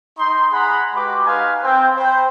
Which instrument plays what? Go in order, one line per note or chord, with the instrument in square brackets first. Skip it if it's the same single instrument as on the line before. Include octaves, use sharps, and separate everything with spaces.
[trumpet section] D#4 C6
G#4 F#5 A#5 B5
G#3 F#4 G4 B4 C6 D6
D#4 B4 F5 G#5 A#5 C6
C4 G5
C5 G5 B5